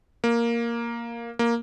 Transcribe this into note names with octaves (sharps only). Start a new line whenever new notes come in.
A#3
A#3